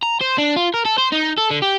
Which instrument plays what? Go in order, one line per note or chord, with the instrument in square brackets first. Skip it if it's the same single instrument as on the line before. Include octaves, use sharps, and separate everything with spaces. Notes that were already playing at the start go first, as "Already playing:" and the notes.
[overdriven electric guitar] A#5
C5
D4
F4
A#4
A4
C5
D#4
A4
D3
G4